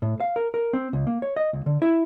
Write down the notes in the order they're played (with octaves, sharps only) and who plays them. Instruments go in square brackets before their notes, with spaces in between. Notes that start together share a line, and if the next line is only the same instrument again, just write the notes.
[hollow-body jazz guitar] A2
F5
A#4
A#4
C4
C#2
A#3
C#5
D#5
C#2
D3
E4